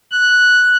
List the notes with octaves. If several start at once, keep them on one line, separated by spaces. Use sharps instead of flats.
F#6